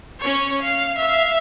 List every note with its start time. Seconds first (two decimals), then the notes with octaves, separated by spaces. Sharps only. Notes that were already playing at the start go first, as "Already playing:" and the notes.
0.19 C#4 C#5
0.61 F5
0.98 E5 F5